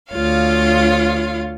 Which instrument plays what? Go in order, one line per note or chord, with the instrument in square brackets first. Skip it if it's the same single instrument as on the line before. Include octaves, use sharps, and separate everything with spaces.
[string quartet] D2 F4 C#5 F5